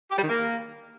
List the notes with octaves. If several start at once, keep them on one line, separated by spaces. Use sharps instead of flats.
G4
G3
D#3
A#3